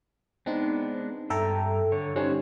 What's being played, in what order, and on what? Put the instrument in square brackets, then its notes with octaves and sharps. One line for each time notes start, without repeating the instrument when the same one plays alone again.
[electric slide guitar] G#3 B3 D4 [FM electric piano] C4 D#4
[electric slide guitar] G2 G5 A#5 [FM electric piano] A4 E5
[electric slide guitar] D3 C#5
[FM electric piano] G3 C#4 D#4 [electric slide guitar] F#4 C5 C#5